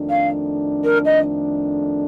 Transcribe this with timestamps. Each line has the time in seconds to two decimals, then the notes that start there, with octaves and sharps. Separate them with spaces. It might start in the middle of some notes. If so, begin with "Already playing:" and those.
Already playing: F2 D#3 A3 D4
0.10 F5
0.84 A#4
1.05 D#5